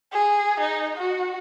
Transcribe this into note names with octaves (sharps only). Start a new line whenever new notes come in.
G#4
D#4
F#4